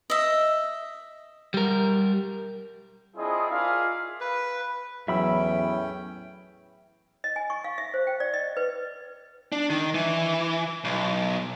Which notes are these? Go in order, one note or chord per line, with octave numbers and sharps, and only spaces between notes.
D#5 E5
G3 A#4
C4 D4 E4 F4 G#4 D#5
F4 G#4 A#4 D5 E5 F5
B4
E2 A2 F#3 C#4 E5 G5 B5 E6
D#5
G#5
C#6
F5
E5
C5
G5
D5
D#5
B4
D4
D#3
E3
B1